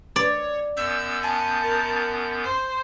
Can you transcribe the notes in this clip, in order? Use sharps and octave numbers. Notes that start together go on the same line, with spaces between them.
C#5 D5
F#2 B3 E6 G6
G#5 A5
A#4
C5